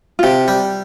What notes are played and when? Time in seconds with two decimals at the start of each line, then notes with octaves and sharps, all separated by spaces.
0.19 F4
0.23 C3 G4
0.48 G3